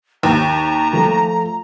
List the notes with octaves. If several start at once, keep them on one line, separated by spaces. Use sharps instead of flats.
D#2 A#5
F3 A3